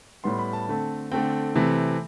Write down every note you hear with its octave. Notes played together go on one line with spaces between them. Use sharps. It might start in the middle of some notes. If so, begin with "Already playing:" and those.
A2 G3 B3 C6
B5
A5
D3 A3 C4
D3 A3 C4 G5
C3 E3 A3 C4